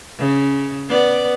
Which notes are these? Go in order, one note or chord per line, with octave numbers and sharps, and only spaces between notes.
C#3
B3 D5